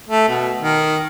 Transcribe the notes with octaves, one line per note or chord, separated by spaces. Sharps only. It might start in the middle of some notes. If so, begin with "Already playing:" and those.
A3
B2
D#3